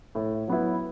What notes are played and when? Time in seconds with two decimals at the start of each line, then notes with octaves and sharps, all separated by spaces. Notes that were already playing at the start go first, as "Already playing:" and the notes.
0.15 A2
0.48 F#3 B3 E4